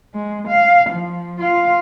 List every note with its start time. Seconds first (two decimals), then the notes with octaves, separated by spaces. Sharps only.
0.14 G#3
0.48 F5
0.89 F3
1.40 F4 F5